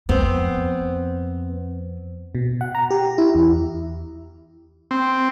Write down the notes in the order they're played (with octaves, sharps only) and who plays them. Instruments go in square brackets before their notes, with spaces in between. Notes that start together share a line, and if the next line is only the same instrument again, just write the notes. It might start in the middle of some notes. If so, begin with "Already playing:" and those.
[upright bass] F2 [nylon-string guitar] B3 C4
[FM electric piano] B2
F#5
A#5
G4
E4
E2
[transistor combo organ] C4